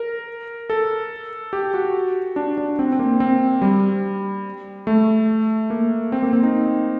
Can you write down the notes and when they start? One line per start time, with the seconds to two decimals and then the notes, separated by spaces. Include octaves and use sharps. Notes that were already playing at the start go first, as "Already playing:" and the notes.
Already playing: A#4
0.70 A4
1.53 G4
1.74 F#4
2.36 D4
2.58 D4
2.79 C4
2.92 C4
2.99 A#3
3.20 C4
3.62 G3
4.87 A3
5.70 A#3
6.12 C4
6.23 A#3
6.33 C4
6.43 D#4